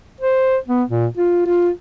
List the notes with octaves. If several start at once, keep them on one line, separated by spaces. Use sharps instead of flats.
C5
B3
A#2
F4
F4